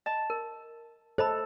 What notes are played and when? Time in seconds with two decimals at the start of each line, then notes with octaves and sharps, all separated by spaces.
0.06 D#5 A5
0.30 A#4
1.18 A4 C5 D#5 B5